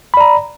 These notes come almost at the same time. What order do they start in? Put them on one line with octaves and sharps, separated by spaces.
B5 D5 A#5